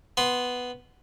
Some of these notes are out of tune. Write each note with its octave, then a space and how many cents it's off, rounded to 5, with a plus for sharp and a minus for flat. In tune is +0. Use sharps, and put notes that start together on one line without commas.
B3 +0 C6 +0